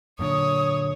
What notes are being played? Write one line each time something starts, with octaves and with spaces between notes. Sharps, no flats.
F#2 A#2 D3 C#5 D#6